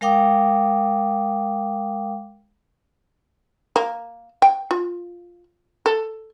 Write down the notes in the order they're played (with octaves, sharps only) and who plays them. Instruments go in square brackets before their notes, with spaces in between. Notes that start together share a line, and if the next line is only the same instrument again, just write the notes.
[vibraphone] G#3 A#4 F5 G5 D6 D#6
[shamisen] A#3
G5
F4
A4